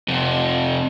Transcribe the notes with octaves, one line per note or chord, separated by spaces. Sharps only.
F2 C3